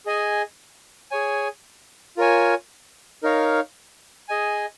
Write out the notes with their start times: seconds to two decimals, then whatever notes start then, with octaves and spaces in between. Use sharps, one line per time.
0.06 G#4 D#5 G#5
1.11 G#4 C#5 G#5
2.17 F4 A#4 C#5 G#5
3.23 D#4 A#4 C#5 F5
4.28 G#4 D#5 G#5